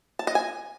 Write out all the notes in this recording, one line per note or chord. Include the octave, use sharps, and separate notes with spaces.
A5
D#5
G#5